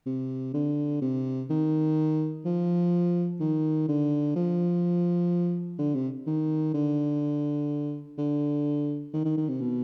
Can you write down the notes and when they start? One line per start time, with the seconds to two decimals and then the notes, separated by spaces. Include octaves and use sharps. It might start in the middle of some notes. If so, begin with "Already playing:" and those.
0.06 C3
0.54 D3
1.02 C3
1.50 D#3
2.45 F3
3.40 D#3
3.88 D3
4.36 F3
5.79 D3
5.95 C3
6.27 D#3
6.74 D3
8.18 D3
9.14 D#3
9.25 D#3
9.37 D#3
9.49 C3
9.61 B2